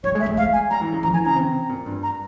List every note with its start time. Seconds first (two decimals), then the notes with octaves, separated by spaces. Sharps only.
0.04 G3 C#5
0.15 G#3
0.20 E5
0.26 G#3
0.37 G#3 F5
0.53 G#5
0.70 G3 A#5
0.81 E3
0.92 C#3
1.03 F3 A#5
1.14 E3 G#5
1.25 C#3 A#5
1.36 C3
1.69 A#2
1.86 G2
2.03 A#5